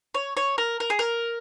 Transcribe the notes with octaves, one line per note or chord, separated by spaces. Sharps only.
C#5
C#5
A#4
A#4
G#4
A#4